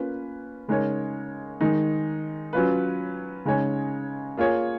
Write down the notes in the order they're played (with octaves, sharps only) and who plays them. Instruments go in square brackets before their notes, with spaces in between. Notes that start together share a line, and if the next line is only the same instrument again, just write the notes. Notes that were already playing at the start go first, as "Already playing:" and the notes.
Already playing: [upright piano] A#3 C#4 F4 B4
C#3 G#3 D#4 A#4 C#5
D#3 G#3 D#4
F#3 C#4 F4 B4
C#3 G#3 D#4 G#4 C#5
A#3 F4 G#4 C#5